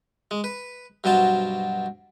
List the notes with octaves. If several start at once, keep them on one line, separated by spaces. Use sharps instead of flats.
G#3
B4
G2 B2 F#3 C5 A5